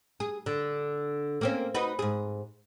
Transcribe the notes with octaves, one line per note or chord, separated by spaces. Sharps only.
G#4
D3
A#3 C4 C#4
D#4 F#4 B4
G#2 G#4